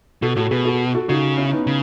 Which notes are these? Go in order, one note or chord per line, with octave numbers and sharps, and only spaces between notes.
B2 F#4 A4
A2 F#4 A4
B2 G#4 B4
F#4 A4
F#4 A4
C#3 D#4 F#4
C#4 E4
B3 D#4
C#3